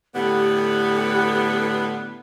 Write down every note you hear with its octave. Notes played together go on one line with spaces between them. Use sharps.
A2 D3 B3 G4